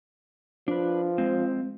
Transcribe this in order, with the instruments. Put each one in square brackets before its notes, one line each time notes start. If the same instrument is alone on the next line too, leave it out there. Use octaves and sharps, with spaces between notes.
[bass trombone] F3 [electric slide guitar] D4 B4
[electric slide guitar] G#3 C4